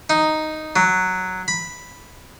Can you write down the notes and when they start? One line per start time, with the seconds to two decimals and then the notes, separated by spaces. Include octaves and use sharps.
0.10 D#4
0.76 F#3
1.48 B5